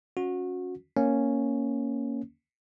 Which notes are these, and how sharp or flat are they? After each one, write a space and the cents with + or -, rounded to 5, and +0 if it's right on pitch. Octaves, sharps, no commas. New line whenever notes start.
C#4 +0 F#4 -25
A#3 +0 C#4 +0